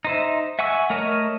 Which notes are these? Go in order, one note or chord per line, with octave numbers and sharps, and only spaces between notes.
D#4 C5 E5
E5 F#5 G#5 C#6 E6
A3 A#4 C#5 D#5 E5